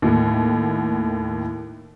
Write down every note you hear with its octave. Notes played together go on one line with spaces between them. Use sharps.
D#2 A2